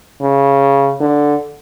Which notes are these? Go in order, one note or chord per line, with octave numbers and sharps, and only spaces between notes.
C#3
D3